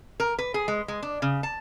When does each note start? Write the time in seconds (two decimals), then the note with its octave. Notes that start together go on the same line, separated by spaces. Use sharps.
0.20 A#4
0.39 B4
0.54 G#4
0.68 G#3
0.88 G#3
1.02 D4
1.22 C#3
1.43 A5